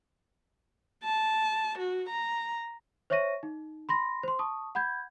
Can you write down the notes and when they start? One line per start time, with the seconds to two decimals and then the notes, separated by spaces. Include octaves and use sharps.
1.04 A5
1.79 F#4
2.10 A#5
3.10 C5 C#5 E5 C#6 A#6 D#7
3.43 D#4
3.89 B5 C6 A#6
4.23 C5 C6
4.39 A5 C#6 D#6
4.75 F#5 B5 G6 G#6